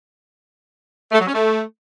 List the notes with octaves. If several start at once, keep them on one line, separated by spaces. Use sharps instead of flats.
A3
F#3
C#4
A3